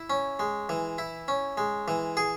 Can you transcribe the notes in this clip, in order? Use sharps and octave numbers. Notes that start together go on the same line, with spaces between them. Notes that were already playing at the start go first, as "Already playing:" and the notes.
Already playing: E4
C#4
G#3
E3
E4
C#4
G#3
E3
G#4